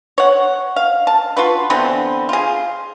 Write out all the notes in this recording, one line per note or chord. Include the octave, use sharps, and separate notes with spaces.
C#5 F#5
F5
A5
F4 F#4 B4
D3 E3 B3 C4
F4 G#4